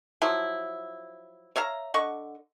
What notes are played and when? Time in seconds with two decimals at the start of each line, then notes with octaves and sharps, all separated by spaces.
0.22 F3 F#3 E4
1.56 C#5 E5 F5 A#5
1.94 D3 D#5 F#5 C#6